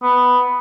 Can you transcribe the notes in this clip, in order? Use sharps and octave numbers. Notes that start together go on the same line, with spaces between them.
B3